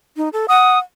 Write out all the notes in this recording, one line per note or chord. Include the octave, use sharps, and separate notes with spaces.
D#4
A4
F#5 D#6